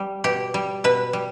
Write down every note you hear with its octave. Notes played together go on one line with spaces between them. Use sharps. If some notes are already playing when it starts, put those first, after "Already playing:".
Already playing: G3
B2 G4
G3
B2 B4
G3